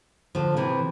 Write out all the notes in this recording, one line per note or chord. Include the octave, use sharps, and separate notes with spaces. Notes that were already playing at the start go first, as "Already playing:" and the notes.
D3 F3
C3 E3